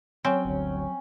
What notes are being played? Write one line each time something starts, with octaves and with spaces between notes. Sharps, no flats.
F#3 C4 C#4 G5
G1 D2